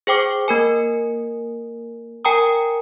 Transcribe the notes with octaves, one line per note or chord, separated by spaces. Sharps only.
G#4 C5 G5 D6
A#3 A#4 G#5
A#4 G5 G#5 A#5 D#6